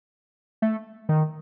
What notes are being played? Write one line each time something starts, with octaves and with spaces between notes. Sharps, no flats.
A3
D#3